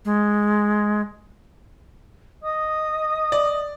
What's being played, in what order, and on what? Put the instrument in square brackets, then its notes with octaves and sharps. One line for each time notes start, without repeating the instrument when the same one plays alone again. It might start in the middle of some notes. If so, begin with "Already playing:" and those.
[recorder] G#3
[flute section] D#5 D#6
[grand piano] D5